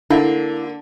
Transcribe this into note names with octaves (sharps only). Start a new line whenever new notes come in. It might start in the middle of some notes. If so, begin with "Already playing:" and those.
D3 A#3 D4 E4